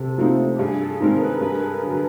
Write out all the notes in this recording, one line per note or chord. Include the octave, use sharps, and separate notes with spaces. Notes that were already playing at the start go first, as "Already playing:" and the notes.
Already playing: C3 A4
F3 A3 C4 D#4
G4
G2 G#4
A4
D#3 G#3 C4 D#4 A#4
B4
G2 B4
D3 F#3